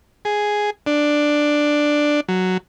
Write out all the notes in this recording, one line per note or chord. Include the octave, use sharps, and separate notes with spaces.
G#4
D4
F#3